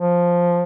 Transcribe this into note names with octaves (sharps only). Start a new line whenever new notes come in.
F3